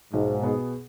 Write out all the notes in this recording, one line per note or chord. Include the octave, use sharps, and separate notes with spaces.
B1 G#2
B2 B3 G#4